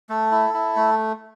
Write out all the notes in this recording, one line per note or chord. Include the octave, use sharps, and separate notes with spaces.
A3 A4
E4
E4
A3